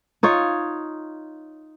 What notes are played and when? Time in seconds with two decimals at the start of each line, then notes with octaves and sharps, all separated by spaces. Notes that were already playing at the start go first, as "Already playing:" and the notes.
0.23 D#4 F4 C#5